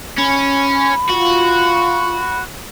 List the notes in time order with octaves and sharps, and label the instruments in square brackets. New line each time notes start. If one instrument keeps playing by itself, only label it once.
[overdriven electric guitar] C#4 [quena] B5
[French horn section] F4 [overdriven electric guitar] F#4